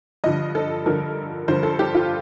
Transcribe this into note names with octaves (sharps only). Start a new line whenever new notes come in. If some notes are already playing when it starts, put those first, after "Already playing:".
G2 D3 F3 D#5
A4
G2 D3 F3 A#4
G2 D3 F3 C5
A4
G4
F4